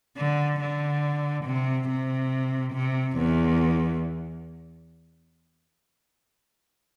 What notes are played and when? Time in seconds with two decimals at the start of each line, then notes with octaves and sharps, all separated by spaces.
0.17 D3
0.61 D3
1.45 C3
1.89 C3
2.73 C3
3.17 E2